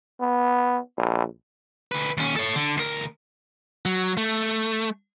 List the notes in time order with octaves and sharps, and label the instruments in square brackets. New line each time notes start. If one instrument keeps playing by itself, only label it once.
[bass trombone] B3
A#1
[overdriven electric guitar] D2 B4
D#2 C#4
A4 C#5
D3
D2 A#4
[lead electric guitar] F#3
A3